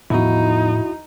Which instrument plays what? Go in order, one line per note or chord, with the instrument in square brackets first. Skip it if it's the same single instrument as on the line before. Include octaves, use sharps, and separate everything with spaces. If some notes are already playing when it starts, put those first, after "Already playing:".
[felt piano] E2 D#3 F3 [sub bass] A2 [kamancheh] D#4 [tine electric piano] E4 F#4